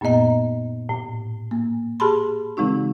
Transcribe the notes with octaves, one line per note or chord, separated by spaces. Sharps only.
F#2 A#2 A#3 B3 D#5 A#5
A2
A#3
G4 G#4 A5 B5 C6
C#3 E3 G#3 C4 D#4 F#4